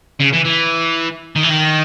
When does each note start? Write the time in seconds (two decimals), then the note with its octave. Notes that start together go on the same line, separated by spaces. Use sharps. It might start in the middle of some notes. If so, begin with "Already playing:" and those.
0.20 C#3
0.33 E3
0.46 E3
1.36 D#3
1.43 E3
1.49 D#3